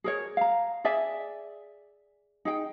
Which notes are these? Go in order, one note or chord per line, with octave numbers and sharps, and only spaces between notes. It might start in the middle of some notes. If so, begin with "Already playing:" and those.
G#4 A#4 C#5
F5 A#5
G#4 D5 E5 G#5
D#4 G#4 G5